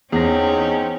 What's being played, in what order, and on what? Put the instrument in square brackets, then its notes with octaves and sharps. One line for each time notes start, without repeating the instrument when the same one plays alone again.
[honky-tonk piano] E2 A#6 [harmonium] C4 D#4 [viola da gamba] C#4 [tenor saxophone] G#4